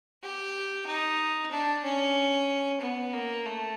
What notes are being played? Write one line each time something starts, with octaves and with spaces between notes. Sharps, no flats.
G4
D#4
D4
C#4
B3
A#3
A3